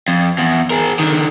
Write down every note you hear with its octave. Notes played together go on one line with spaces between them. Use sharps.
F2
E2
G#4 A#4
D3 D#3